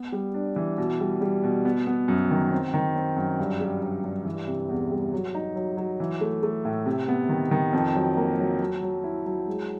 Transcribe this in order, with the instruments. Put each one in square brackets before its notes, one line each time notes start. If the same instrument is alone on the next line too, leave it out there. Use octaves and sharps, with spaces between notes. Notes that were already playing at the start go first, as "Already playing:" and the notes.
Already playing: [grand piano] B3
G3
D4
E3
B2
G3
G3
B2
B3
B3
F#2
D#3
C4
D#3
C4
F#2
G2
G3
G2
G2
E3
C3
E2
G3
F#3
D#4
F#3
F#3
E3
A3
A3
A2
C3
B3
D#3
D#3
F2
F#3
A#3
F#3
F#3
F#3
E4
F#3
G#3